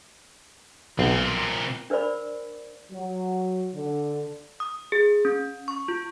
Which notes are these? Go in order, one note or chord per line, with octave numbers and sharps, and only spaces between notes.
B1 A#2 C4
D4 A#4 C5 D5 B5
F#3
D3
D#6
G#4
C#4
C#6
F4